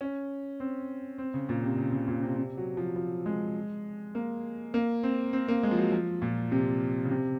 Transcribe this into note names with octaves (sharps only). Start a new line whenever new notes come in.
C#4
C4
C4
C#3
A#2
C3
C#3
C#3
A#2
C3
C3
F#3
F3
F3
G#3
A#3
A#3
C4
C4
A#3
G#3
F3
F#3
F3
A#2
C3
C#3
C3